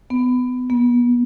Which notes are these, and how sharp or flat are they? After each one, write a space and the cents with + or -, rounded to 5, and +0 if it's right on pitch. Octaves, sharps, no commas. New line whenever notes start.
B3 +25
B3 -30